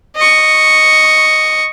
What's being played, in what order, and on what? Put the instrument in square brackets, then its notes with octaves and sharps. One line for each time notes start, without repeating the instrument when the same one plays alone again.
[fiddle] D#5 C#6